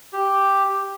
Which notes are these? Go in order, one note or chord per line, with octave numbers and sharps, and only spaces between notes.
G4